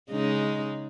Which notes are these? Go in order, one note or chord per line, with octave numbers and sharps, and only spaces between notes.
C#3 G#3 D#4